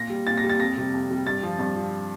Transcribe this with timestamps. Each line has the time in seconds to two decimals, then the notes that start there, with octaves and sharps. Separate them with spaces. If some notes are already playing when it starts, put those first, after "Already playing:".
Already playing: A#2 A#6
0.10 G3
0.27 A#2 A6
0.38 A#6
0.44 G3
0.50 A6
0.60 F2 A#6
0.77 C3 G3
0.94 F2
1.10 C3 G3
1.27 G2 A6
1.43 F3
1.59 G2
1.76 F3